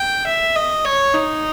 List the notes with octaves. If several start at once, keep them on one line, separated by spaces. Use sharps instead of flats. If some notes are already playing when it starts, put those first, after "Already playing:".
Already playing: G5
E5
D#5
C#5
D#4